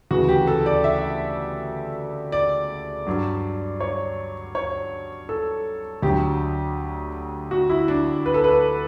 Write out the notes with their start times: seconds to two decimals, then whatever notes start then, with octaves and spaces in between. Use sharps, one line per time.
0.11 D2 C#3 E3 F#4
0.29 G4
0.47 A4
0.66 D5
0.84 E5
2.32 D5
3.07 G2 F#3
3.80 C#5
4.55 C#5
5.29 A4
6.02 D2 D3 F#3 G4
7.51 F#4
7.70 E4
7.88 D4
8.26 B4
8.34 A4
8.44 B4